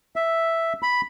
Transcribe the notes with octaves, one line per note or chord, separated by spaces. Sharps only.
E5
B5